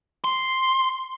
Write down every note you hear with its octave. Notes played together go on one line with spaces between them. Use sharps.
C6